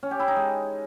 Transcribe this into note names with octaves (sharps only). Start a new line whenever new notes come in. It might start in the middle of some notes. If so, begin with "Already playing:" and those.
C#4
G4
E4
D#4
G#3